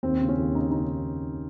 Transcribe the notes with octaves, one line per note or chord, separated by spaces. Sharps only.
D#2 C4
C#3
C#4
D#2
C#3 D#4
C#3 D#4